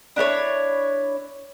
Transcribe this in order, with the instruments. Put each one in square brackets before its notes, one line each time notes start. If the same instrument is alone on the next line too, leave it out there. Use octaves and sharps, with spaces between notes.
[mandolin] D4 E4 A#4 C#5